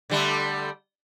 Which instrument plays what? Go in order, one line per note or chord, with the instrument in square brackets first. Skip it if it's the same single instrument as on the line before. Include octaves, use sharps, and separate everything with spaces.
[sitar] D3 G3 A3